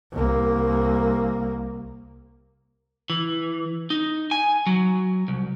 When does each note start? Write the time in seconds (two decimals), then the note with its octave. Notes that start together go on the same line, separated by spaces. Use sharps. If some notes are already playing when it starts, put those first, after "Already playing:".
0.12 C2 A#3
3.10 E3
3.90 D#4
4.31 G#5
4.67 F#3
5.28 C2